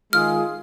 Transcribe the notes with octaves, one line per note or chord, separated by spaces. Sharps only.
D#3 G#3 F4 G#4 F6